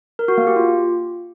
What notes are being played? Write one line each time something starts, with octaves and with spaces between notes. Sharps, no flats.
A#4
F#4
A#3
G4
F4